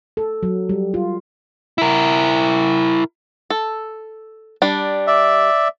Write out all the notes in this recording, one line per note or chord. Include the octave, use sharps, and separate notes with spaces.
A4
F#3
G3
F4
E4 A#4
A4
G3 D4
D5 E5